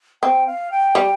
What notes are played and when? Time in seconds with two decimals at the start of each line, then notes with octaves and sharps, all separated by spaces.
0.23 C4 G5
0.47 F5
0.71 G5
0.95 G3